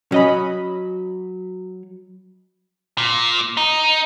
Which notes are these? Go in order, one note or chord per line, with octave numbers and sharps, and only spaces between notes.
F#3 C#4 D#5 B5
A#2
D#4